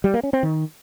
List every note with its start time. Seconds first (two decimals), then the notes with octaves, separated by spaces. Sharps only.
0.04 G3
0.14 A#3
0.23 C#4
0.33 C4
0.43 D#3